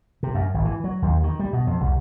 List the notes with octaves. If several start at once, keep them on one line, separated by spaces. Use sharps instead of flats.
C3
F#2
G#1
E3
F#3
D#2
D#3
G3
B2
F2
C2